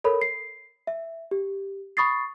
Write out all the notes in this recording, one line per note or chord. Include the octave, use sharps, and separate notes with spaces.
A4 A#4 C#5 B5
C7
E5
G4
B5 C#6 D#6 A6 C7